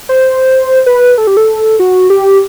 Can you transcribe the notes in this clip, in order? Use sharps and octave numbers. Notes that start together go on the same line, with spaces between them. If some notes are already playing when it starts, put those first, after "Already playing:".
C5
B4
A4
G4
A4
F#4
G4